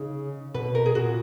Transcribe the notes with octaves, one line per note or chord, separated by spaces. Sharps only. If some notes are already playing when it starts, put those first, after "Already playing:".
Already playing: C#3 D#4
B2 B4
A#4
G#4
A#2 F#4